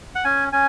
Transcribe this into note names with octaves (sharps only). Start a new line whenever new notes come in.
F#5
C#4 G#5
C#4 G#5